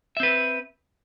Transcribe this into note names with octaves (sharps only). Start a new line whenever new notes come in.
C4 B4 E5